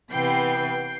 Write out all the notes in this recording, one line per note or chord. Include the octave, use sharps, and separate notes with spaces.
C3 E3 B3 G5 C7